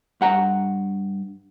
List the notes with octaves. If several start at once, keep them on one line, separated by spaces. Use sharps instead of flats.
G2 F#5 A#5